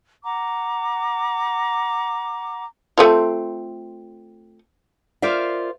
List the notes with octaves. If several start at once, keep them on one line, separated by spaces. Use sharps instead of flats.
F#5 A#5 D6
A3 C4 F4
F4 A#4 C5 D5 E5 F5